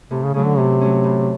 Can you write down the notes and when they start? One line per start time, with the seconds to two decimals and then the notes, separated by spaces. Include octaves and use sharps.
0.10 A2 C3
0.23 C#3
0.34 C#3 F#3 A3 C#4
0.45 D3
0.57 A2 C3
0.81 F#3 A3 C#4
1.04 A2